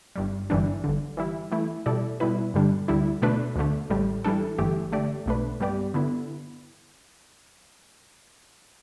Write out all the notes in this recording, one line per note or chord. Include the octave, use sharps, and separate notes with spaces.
G1 G2 G3
G1 G2 E3 G3 D4
G1 G2 D3
E3 G3 E4
E3 A3 E4
B2 G3 E4 A4 D5
B2 G3 E4 B4
G2 D3 G3 D4
D2 D3 G3 E4
B2 A3 D4 B4
D2 D3 A3
A1 A2 G3
E3 G3 D4 A4
G1 G2 E3 A3 G4
D3 A3 G4 D5
B1 B2 A3 D4 B4
G2 G3 B3 G4 D5
D3 B3 E4